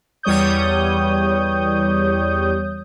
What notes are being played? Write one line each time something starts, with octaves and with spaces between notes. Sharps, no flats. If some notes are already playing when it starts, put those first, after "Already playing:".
E2 G3 C#5 D#6 G6